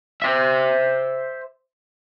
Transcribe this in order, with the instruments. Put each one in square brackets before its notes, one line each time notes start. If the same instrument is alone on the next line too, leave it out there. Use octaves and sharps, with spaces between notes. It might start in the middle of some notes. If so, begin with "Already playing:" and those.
[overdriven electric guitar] C5 E5